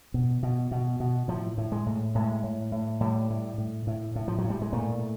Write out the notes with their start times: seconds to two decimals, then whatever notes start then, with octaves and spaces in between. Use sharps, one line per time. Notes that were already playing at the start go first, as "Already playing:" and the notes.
0.14 B2
0.43 B2
0.71 B2
1.00 B2
1.28 A2 F3
1.58 A2
1.72 G#3
1.86 A2
2.15 A2 G#3
2.43 A2
2.72 A2
3.01 A2 G3
3.30 A2
3.58 A2
3.87 A2
4.16 A2
4.28 F3
4.38 F#3
4.44 A2
4.50 G3
4.62 G#3
4.73 A#2 A3